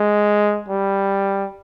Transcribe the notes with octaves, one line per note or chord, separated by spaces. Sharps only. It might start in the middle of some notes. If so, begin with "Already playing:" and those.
Already playing: G#3
G3